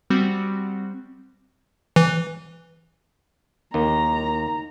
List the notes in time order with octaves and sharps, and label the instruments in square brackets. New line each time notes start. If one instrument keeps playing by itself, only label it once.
[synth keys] G3 C4 F#4
[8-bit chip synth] E3
[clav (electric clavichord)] D#2 [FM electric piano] D#4 A#4 [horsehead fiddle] A#5